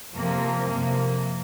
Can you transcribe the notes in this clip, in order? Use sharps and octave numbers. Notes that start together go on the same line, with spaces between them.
F2 C3 F3 A#3
F2 C3 F3 A#3